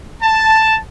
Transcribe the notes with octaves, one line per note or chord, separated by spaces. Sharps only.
A5